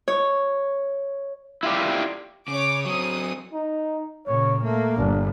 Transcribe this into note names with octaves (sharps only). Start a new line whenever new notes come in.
C#5
E4 F4 G4 D5
C#3 C#5 D6
F#3 C4 D#6
D#4
A#2 C#3 C#5
A3 A#3
G1 D4